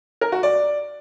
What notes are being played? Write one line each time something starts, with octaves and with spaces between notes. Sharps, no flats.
A#4
F#4
D5